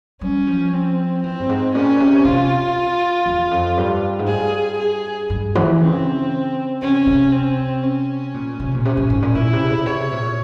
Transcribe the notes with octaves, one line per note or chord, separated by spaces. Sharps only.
G3 C#4
F3
C4
E3 C4
G2
G#2
A#2 C#4
C3
C3 F4
E2
F2
G2
G#2
G2 G#4
G#4
G2
E3
C#3 C4
C3 C#4
C3
C4
C#4
A#2
C3
A#2
C3 C#4
A#2
G#2
A#2
A#2 E4
C3
C#3
C3 C#5
A#2